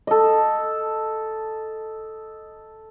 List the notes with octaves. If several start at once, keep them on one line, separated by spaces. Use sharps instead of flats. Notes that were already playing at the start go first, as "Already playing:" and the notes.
A4 D#5